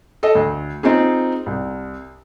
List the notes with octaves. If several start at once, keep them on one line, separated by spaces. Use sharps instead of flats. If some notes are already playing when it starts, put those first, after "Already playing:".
A4 D#5
D2
C4 D#4 F4 G#4
C2